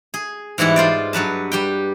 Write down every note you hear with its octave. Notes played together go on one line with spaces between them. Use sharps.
G#4
G#2 E3 G3 E4 F#5
F4 C5 D5
G2 F#3 B4 A5
G3 G4 G5